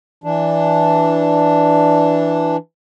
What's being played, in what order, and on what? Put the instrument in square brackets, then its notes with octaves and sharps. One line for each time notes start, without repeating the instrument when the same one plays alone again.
[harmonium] E3 D4